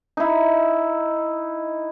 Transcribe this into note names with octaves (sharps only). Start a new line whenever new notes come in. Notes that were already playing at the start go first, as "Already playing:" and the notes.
D#4 E4